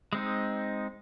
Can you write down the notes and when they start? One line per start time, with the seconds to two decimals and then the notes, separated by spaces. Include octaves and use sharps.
0.13 G#3 C4 D#4